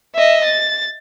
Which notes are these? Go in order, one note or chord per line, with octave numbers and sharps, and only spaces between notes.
D#5 E5
A6